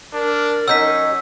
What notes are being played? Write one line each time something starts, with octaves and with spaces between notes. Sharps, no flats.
D4 A#4
F#3 C#4 D#4 E6 G6 B6